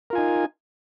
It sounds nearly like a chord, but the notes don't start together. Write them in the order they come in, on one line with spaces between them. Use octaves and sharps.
A#4 F4 G#5 D#4